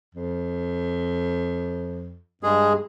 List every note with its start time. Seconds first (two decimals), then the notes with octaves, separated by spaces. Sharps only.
0.15 F2
2.43 G2 G#3 G#4